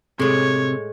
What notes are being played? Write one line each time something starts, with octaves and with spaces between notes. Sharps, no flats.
A2 C3 G#3 C#5